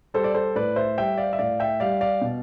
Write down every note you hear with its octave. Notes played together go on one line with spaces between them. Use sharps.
G3 A4 C5
D5
A4 C5
A2 B4 D5
C5 E5
G3 E5 G5
D5 F5
E5
A2 D5 F5
E5 G5
G3 D5 F5
D5 F5
B2